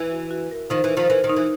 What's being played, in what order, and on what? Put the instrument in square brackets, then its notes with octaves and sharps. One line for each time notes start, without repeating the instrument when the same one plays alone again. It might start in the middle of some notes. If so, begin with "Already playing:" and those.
Already playing: [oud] E3
[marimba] F#4
F#4
A#4
[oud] D#3 F3 [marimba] D#4
[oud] E3
[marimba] A#4
[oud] D#3 F3
[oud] E3 [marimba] A#4
[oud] D#3
[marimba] D#4
[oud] E3